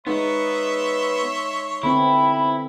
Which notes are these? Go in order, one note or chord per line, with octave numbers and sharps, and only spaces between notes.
G#3 B3 D#4 C#5 E5 C6
D3 B3 C4 E4 B5